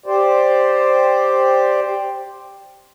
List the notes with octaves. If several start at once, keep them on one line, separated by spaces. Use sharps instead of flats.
G4 C5 D5